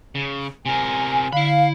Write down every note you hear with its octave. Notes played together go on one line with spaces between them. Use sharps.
C#3
C3 A#4 G#5
D3 E4 F5 B5